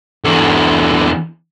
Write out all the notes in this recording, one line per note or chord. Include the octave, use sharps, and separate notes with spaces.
E2 D3